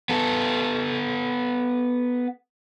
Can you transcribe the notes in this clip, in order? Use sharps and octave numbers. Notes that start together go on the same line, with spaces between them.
B3 A4